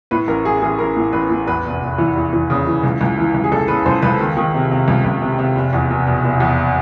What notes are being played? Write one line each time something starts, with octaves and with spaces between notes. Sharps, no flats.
A2 B4
A1 A#4
A1 G#4
A1 G#4
A1 A#4
A2
A1 B4
A2
E2 B4
F1
F1
E3
E2
E3
C#3
E3
C#2
C#2
E3
C#2
G#4
C#2 A4
C#3 B4
C#2 C5
C#2 B4
D#3
D#3
C3
C3
C#2
C#2
C3
C3
F1
E2
F1
B2
F1
E2